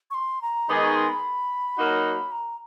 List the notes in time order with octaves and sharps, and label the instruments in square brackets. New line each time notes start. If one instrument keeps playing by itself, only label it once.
[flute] C#6
C6
A#5
[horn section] D#3 G#3 B3 D#4 G#4 [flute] D6
[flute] C#6
C6
B5
[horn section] F#3 A#3 D#4 F#4
[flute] A#5